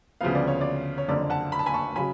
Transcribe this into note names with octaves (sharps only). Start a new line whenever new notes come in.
D2 C#3 F3 B3 F5
D5
C#5
D5
C#5
F#1 F2 D3 D5
F#5 A5
B5
A5
G#5 B5
A5 C#6
C#3 F#3 G#5 B5